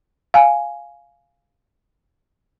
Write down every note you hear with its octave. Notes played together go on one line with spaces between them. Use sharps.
F5 G#5